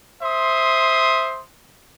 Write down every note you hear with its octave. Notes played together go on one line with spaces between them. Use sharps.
C5 E5 C6 D#6